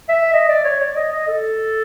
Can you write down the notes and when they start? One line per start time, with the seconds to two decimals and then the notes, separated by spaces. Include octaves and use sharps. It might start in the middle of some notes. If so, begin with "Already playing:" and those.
0.09 E5
0.33 D#5
0.49 D5
0.64 C#5
0.80 D5
0.96 D#5
1.12 D#5
1.28 A4